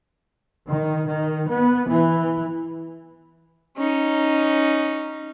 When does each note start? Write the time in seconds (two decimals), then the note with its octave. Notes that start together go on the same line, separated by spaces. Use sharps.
0.68 D#3
1.08 D#3
1.49 B3
1.90 E3
3.77 C#4 D#4